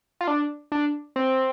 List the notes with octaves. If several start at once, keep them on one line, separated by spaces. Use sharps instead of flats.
F4
D4
D4
C4